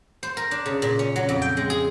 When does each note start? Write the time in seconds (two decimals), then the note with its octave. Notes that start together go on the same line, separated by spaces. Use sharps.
0.23 C5
0.37 A#4
0.51 D4
0.66 C#3
0.82 A#2
0.99 C#4
1.16 F#3
1.29 F2
1.42 G5
1.57 G#3
1.70 G#4